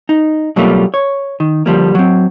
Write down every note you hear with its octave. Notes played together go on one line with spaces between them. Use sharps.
D#4
B2 F#3 G3 A3 A#3 F4
C#5
D#3
D3 F3 G3 A#3
F#3 C4